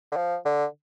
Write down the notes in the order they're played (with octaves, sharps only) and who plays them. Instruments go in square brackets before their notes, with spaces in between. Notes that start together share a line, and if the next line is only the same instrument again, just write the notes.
[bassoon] D3
F3
D3